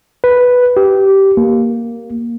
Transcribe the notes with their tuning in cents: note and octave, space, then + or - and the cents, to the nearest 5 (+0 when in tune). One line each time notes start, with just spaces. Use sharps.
B4 +0
G4 -15
A#3 +0